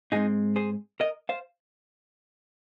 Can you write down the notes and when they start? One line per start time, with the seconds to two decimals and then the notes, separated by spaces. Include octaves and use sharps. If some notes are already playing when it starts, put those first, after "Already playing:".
0.12 G#2 G#3 C4 D#4 G#4
0.56 G#4 C5
1.00 A#4 D#5
1.29 C5 F5